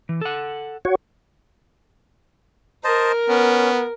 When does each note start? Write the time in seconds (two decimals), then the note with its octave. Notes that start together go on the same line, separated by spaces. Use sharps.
0.09 E3
0.21 A4 F#5
0.85 F#4 C#5
2.84 A#4 C5 D#5 A5
3.29 B3 C#4